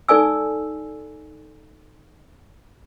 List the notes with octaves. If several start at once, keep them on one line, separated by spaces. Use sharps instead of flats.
D#4 A4 D5 G#5 E6